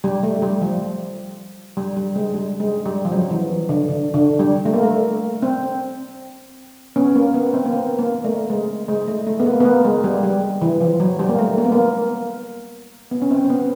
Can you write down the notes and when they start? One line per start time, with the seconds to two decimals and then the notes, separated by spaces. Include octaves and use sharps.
0.04 G3
0.23 A3
0.42 G3
0.61 F3
1.77 G3
1.97 G3
2.16 G#3
2.34 G3
2.60 G#3
2.86 G3
3.05 F3
3.12 F#3
3.30 E3
3.69 D3
3.88 D3
4.14 D3
4.39 G3
4.65 A3
4.74 A#3
4.83 A3
5.42 C4
6.96 B3 C#4
7.15 A#3
7.34 B3
7.54 C4
7.65 A#3
7.73 B3
7.99 A#3
8.24 A3
8.50 G#3
8.89 G#3
9.08 A3
9.27 A3
9.40 B3
9.46 A#3
9.60 B3
9.65 A#3
9.85 G#3
10.04 G3
10.23 G3
10.62 E3
10.81 F3
11.00 F#3
11.19 G3
11.29 A#3
11.39 A3
11.58 A#3
11.65 B3
11.72 A#3
13.11 B3
13.22 C#4
13.31 C4
13.44 C4
13.50 B3